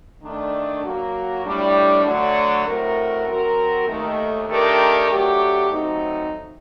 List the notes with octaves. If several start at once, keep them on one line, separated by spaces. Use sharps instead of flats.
D#3 A3 D4
F#3 A#3 F#4
A2 G3 D4
D3 F#3 A3
A2 A3 C4 F#4 A#4
F#3 C4 F#4 A#4
D#2 D#3 A3
D#3 A3 D4 G4 A#4
F#3 A3 D4 G4
F#3 A3 C4 D#4